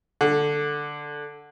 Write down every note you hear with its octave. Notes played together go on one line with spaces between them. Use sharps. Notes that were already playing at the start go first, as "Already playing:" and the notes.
D3